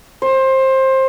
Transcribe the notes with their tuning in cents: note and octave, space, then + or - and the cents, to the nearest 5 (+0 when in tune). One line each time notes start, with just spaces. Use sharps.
C5 +20